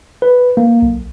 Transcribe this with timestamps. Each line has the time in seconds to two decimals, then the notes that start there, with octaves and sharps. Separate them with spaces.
0.22 B4
0.57 A#3
0.82 B1